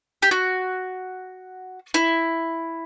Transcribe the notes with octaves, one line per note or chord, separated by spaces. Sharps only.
G4
F#4
E4